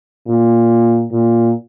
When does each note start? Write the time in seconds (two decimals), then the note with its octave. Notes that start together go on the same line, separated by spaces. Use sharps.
0.28 A#2
1.12 A#2